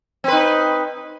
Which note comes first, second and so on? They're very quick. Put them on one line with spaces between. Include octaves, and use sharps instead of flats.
C4 B4 D#4